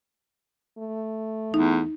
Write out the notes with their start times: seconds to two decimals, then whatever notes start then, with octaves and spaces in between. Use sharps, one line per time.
0.78 A3
1.54 E2 D#4